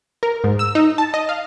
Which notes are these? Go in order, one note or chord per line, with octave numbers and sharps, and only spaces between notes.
A#4
G#2
E6
D#4
A5
D#5
F5